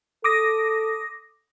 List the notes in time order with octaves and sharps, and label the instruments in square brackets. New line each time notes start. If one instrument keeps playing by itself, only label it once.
[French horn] A4 [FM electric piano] D6 D#6 A#6